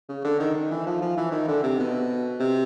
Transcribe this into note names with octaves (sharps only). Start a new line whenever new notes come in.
C#3
D3
D#3
D#3
E3
F3
F3
E3
D#3
D3
C3
B2
C3